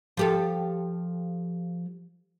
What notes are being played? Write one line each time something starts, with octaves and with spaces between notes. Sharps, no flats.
F3 G4 A4